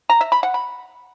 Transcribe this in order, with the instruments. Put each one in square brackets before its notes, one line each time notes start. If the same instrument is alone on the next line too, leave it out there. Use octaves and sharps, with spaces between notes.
[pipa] A#5
E5
B5
F#5
B5